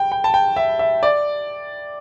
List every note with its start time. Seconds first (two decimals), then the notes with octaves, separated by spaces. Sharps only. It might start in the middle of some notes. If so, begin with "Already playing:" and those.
Already playing: G5
0.12 G5
0.24 A5
0.34 G5
0.57 E5
0.79 E5
1.03 D5